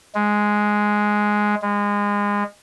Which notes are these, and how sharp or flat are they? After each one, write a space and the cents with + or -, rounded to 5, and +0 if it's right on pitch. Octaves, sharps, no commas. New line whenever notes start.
G#3 +5
G#3 -25